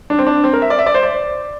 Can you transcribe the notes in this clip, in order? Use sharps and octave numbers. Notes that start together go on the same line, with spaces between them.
D4
C4
D4
C4
A#4
E5
D5
E5
D5
C5
D5